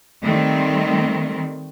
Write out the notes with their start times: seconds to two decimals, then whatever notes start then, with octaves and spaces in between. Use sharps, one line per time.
0.23 D#3 G3 A3 C4